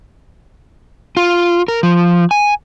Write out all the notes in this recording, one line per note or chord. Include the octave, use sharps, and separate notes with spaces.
F4
A#4
F3
G#5